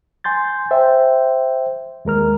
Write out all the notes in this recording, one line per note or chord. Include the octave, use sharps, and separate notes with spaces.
G#5 C6 G6 A6
C5 E5 G5
D#2 G#3 A#4 F6